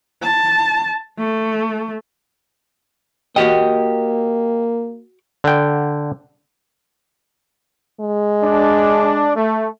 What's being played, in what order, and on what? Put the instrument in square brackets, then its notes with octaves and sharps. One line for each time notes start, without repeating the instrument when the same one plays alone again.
[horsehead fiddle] A5
A3
[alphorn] A#3 [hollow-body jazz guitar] F#4 G5 [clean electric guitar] G4 D#5
[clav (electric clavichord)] D3 G5
[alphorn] G#3
[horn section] D4
A3